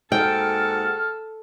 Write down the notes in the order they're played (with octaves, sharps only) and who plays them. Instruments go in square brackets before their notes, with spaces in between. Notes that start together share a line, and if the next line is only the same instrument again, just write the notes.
[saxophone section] G#2 A#3 F#4 [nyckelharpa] A4 [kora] G5 [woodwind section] F6